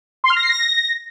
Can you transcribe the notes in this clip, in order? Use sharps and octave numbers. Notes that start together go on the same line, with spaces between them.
C6
F6
A#6
C7
A#6